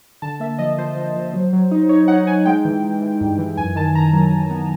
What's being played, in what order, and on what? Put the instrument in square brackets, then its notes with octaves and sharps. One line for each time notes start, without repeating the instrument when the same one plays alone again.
[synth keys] D3 A5
A#3 E5
F3 D#5
F3 C5
F3
F3
F#3
F#3
D#4
D#4 C#5
D#4 F#5
D#4 G#5
G#3 G5
E3
E3
E3
G2
E3
F#2 G#5
D#3 A5
D#3 A#5
F#3
F#3
B3